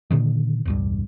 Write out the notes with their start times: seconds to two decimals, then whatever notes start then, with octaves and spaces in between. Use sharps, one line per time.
0.11 A#2 D3 D#3
0.65 E1 C#2 G2